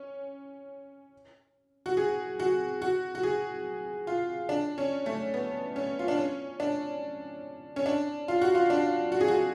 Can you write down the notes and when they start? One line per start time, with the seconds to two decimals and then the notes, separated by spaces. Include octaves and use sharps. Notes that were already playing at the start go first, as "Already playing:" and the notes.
Already playing: C#4
1.86 F#4
1.97 G#4
2.40 F#4
2.82 F#4
3.15 F#4
3.23 G#4
4.07 F4
4.49 D4
4.78 C#4
5.06 A3
5.34 B3
5.76 C#4
5.99 F4
6.08 D4
6.18 C#4
6.60 D4
7.76 C#4
7.86 D4
8.28 F4
8.41 F#4
8.55 F4
8.70 D4
9.12 F#4
9.21 G#4
9.28 F#4